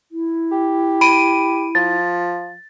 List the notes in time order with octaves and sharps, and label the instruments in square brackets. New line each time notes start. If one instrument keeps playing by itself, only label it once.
[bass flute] E4
[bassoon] G4
[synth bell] B5 D7 D#7
[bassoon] F3 [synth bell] A6